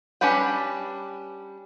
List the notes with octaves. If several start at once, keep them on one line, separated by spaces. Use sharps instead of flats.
G3 C#4 D4 B4 G5